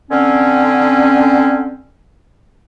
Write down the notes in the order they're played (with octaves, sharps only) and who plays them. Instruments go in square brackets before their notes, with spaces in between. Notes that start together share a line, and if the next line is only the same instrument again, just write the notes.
[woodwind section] D3 C4 C#4